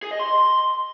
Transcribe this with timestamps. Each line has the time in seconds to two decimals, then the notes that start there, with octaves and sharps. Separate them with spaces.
0.03 G#4
0.11 D#5
0.19 C6